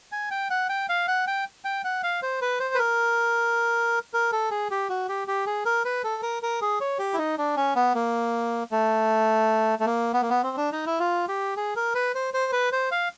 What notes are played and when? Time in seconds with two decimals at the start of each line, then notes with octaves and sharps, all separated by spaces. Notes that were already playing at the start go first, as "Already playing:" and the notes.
0.12 G#5
0.31 G5
0.50 F#5
0.69 G5
0.89 F5
1.08 F#5
1.27 G5
1.65 G5
1.84 F#5
2.03 F5
2.22 C5
2.42 B4
2.60 C5
2.75 B4
2.79 A#4
4.14 A#4
4.32 A4
4.51 G#4
4.71 G4
4.89 F#4
5.09 G4
5.28 G4
5.46 G#4
5.66 A#4
5.85 B4
6.04 A4
6.23 A#4
6.43 A#4
6.62 G#4
6.81 C#5
6.99 G4
7.14 E4
7.18 D#4
7.38 D4
7.56 C#4
7.76 B3
7.95 A#3
8.72 A3
9.80 A3
9.86 A#3
10.14 B3
10.22 A#3
10.30 B3
10.43 C4
10.57 D4
10.72 D#4
10.86 E4
11.00 F4
11.28 G4
11.57 G#4
11.76 A#4
11.95 B4
12.15 C5
12.34 C5
12.52 B4
12.72 C5
12.91 F5